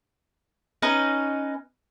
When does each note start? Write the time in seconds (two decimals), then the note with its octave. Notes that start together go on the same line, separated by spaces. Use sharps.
0.82 C#4 D#4 B4 D#5